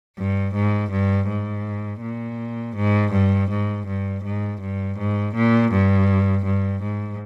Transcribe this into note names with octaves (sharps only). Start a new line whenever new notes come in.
G2
G#2
G2
G#2
A#2
G#2
G2
G#2
G2
G#2
G2
G#2
A#2
G2
G2
G#2